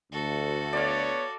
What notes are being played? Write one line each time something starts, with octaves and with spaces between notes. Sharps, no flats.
D2 F#4 A4
B3 C#5 D5 F5